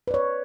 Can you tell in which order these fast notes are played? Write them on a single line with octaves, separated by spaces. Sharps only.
B4 D5 C#5